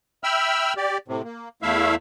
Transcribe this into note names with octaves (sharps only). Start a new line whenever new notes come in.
E5 G5 B5 E6 F6
G4 D5
A2 C3
A#3
E2 A3 E4 E5 F5